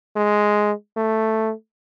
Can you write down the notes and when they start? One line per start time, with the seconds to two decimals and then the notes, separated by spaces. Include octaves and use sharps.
0.16 G#3
0.97 A3